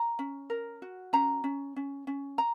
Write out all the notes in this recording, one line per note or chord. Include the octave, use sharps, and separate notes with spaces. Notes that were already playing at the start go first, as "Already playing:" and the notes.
Already playing: A#5
C#4
A#4
F#4
C#4 A#5
C#4
C#4
C#4
A#5